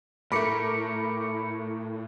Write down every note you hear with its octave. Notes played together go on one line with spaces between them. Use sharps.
A2 A3 A#4 B5 D6 C#7